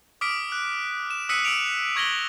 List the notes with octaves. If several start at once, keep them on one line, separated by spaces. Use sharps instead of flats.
D6 D#6 F6 B6 D7
F#6
E7
D#6 E6 F#6 B6 C#7 D#7
E6 C#7 D7 F7
C#6 G#6 A#6 F#7 G7